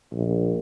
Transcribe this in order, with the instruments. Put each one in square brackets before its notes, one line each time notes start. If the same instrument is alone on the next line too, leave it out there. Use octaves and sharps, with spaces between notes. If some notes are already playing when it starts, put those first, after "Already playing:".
[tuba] A#1